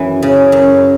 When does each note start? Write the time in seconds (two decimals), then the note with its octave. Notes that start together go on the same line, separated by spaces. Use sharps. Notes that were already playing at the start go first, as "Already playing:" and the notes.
Already playing: F#2 E3
0.23 C#3
0.52 F#2